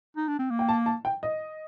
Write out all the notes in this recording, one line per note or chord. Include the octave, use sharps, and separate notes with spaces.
D#4
D4
C4
A#3
G5
A5
A5
G5
D#5